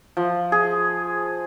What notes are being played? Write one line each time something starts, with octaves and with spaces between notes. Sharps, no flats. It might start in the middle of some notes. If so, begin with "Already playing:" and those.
F3
G#4